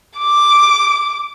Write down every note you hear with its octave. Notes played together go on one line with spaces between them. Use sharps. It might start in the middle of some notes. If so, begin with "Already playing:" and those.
D6